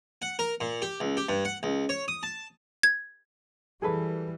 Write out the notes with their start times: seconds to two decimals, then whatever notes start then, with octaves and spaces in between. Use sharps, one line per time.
0.22 F#5
0.39 A#4
0.61 A#2
0.82 G4
1.00 C#2
1.17 G4
1.29 G2
1.45 F#5
1.63 C#2
1.89 C#5
2.08 D#6
2.23 A5
2.83 G#6
3.82 E3 G3 G#4 A4 B4